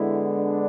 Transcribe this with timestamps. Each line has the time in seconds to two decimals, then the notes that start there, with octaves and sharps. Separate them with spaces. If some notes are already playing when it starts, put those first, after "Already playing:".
Already playing: D3 G#3 B3 E4
0.37 D4